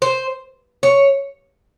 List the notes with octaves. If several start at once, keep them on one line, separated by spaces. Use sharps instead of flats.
C5
C#5